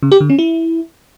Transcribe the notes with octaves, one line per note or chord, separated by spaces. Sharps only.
C#3
G4
D3
C#4
E4